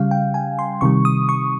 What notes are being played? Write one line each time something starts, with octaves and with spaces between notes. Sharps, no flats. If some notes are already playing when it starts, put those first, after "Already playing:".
Already playing: C#3 G3 F5
G5
G#5
C6
C3 D#3 G3 C#6
D#6
C#6